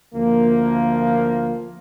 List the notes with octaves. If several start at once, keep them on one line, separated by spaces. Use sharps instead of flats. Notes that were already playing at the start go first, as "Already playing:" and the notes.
D2 F3 A#3